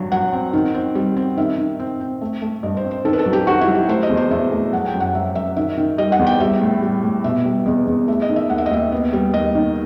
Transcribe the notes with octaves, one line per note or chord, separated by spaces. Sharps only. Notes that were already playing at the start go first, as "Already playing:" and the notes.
Already playing: G2 F#3
F#3 F#5
C4
D#3
C4
G3
C4
D#3 E5
D#3
C4
C4
A3
A3
G2 D#5
C5
C4
C5
D#3 A4
B4
A4
F#3
G4
D#3 F#4
E4
F#3
G4
A3 C5
D#5
E2
C5
E2 E5
A3
F#3 F#5
G5
F#2
F#5
F#3 E5
F#2 E5
D#3 E5
D#3
G3 D#5
F#5
E2
G5
G3 E5
A2
G3
A2
B2 E5
G3
E2 D#5
E2
A3 E5
D#5
D#3
E5
D#2 F#5
E5
D#5
D#2 E5
B3
G3
D#2 D#5
D#3